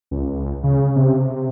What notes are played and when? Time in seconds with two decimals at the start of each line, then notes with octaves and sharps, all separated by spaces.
0.11 C#2
0.64 C#3
0.96 C3